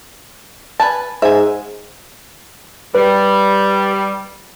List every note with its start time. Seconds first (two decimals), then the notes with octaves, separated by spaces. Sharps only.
0.80 B4 G#5 A5
1.22 G#2 E5 G#5
2.95 G3 B4